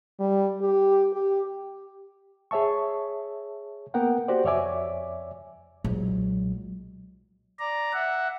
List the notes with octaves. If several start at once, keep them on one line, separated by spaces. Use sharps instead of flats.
G3
G4
G4
G#4 C#5 E5 A5 C#6
A#3 B3 A#4 F#5 G5
F#4 G4 C5 D5
F2 C#5 D5 E5 G#5 D6
B1 A#2 F#3 G#3
D5 A#5
E5 F#5